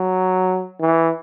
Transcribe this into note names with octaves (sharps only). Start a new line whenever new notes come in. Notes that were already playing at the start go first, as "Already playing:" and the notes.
Already playing: F#3
E3